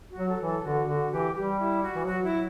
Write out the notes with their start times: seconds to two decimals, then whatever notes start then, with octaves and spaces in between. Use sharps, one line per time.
0.11 F#4
0.17 F#3
0.29 A4
0.41 E3
0.47 A4
0.64 D3 F#4
0.88 D3 F#4
1.12 E3 G4
1.35 G3 G4
1.59 E4
1.83 F#4
1.95 E3
2.06 F#3 F#4
2.24 E4